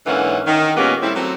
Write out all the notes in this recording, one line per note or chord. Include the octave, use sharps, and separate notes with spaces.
G#2 D3 E3 A#3 C#4 F#5
D#3
A#2 G#3 A#3 B3 C#4 G4
G3 A3 C4 E4
F#3 A3 C4